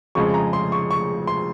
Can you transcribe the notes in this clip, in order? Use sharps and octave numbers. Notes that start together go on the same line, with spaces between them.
F2 C#3 F3 G#3 C#6
A#5
C6
C#6
C#6
C6